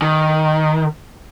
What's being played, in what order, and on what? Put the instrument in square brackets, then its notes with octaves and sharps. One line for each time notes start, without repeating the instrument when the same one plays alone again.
[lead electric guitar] D#3